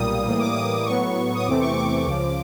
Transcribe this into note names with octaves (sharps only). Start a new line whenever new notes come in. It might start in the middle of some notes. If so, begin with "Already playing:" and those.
Already playing: B1 A#2 G3 A#3 D#6
A2 E3 G3 A#3 D#6
D6
D#6
A2 F#3 B3 C#6
D#6
E2 C3 E3 A3 C4 D6
C#6
D6
C#2 C#3 F3